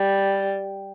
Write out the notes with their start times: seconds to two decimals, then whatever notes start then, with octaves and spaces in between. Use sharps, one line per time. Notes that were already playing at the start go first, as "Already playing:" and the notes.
Already playing: G3